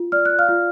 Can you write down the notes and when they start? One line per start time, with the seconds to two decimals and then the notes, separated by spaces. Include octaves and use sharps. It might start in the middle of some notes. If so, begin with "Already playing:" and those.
Already playing: F4
0.12 D5 F6
0.26 F#6
0.39 F5 F6
0.49 F4